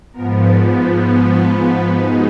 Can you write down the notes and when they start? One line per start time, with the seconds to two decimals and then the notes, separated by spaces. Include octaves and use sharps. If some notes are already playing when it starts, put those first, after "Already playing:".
0.13 G#2 F3 B3 A#4
0.42 D5
0.73 B4
1.02 B4
1.31 B4
1.61 B4
1.91 B2 G#3 D#4 B4